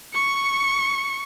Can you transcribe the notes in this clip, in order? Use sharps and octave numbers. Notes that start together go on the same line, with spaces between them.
C#6 C#7